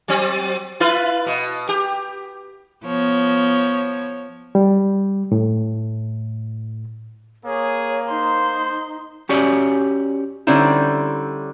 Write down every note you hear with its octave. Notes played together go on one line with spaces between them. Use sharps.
F#3 C4
E4 F4 B4
B2
G4
F3 B3 C#5
G3
A2
A#3 G#4 C#5
D#4 C5 C6
C#4 F#4 G4 C#5 D5
D3 G3 C4 C#4 D#4 E4